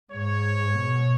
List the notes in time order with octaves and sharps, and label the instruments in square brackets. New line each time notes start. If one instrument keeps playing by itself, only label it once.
[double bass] G#2 [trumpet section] C#5
[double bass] B2